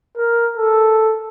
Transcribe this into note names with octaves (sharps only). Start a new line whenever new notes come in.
A#4
A4